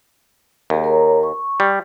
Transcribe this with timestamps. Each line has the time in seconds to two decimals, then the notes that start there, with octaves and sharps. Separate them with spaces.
0.70 D#2 G4 G#4 A#4
0.84 A#4 C#5 A#5
1.23 C#6
1.60 G3